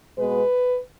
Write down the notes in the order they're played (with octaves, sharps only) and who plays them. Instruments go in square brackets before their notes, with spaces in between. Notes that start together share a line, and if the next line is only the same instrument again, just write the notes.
[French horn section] B2 G#3 B3 B4